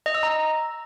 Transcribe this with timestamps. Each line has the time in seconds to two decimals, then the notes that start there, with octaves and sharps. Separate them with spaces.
0.06 D#5
0.15 E6
0.23 A#5